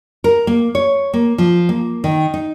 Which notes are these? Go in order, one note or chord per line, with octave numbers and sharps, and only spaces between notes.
A#4
A#3
C#5
A#3
F3
A#3
D#3
D#4